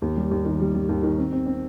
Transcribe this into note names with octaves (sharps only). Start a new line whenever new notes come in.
D#2
G3
D#2
D#3
G3
G3
D#2
D#3
C4
C4
C4